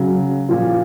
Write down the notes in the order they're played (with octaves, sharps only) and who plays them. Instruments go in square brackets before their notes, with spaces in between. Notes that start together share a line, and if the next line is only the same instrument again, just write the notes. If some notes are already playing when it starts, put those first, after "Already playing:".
Already playing: [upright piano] C#3 F#3
A#2 F3